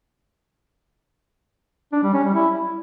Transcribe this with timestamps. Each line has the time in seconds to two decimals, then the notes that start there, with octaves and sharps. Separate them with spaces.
1.93 D4
2.03 G3
2.13 C#4
2.24 G3
2.34 E4